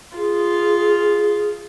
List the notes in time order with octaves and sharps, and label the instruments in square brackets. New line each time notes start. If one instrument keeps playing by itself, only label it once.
[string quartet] F4 [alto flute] G#4